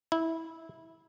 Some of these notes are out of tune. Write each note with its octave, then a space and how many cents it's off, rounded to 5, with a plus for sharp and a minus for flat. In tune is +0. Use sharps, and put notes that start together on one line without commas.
E4 -15